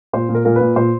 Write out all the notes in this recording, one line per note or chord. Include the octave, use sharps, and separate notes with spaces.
A#2 C5
A#2
A#4
A#2 A#4
A#2 B4
A#2 C5